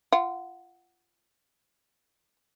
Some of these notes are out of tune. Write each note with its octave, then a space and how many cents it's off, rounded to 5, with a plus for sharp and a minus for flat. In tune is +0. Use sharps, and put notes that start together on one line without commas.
F4 -20 F#5 +5